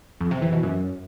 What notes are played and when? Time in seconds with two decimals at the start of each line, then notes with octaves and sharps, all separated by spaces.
0.20 F2
0.31 C3
0.42 E3
0.52 B2
0.63 F#2